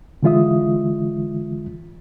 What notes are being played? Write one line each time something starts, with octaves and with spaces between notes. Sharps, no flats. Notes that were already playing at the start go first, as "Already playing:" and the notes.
D3 E3 G#3 F4 E5 D#6